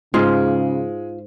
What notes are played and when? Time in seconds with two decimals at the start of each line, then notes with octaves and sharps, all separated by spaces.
0.14 G#2 C#3 G#3 F4